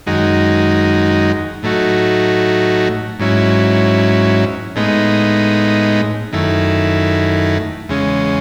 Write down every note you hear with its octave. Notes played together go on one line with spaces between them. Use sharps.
F#2 D#3 G#3 D#4 F#4
A2 F#3 A3 D#4 F#4
G#2 F#3 C#4 E4
A2 G#3 B3 D#4
F#2 D#3 A3 E4
E2 C#3 G#3 C#4